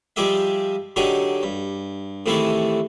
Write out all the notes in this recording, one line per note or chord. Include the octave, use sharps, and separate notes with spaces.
F3 G3 G4 G#4 D#5 E5
D3 F#3 D#4 G4 G#4
G2
A2 C3 D#3 E3 G#4 A4